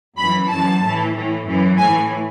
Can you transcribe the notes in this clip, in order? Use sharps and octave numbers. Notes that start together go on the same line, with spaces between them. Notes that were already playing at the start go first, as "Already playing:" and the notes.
F#2 E3 B5
F#2 E3 A5
A2 E3
A2 E3
F#2 E3
A2 E3 G#5